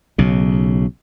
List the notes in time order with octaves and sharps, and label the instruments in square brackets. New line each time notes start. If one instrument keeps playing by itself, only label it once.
[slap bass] B1 C#3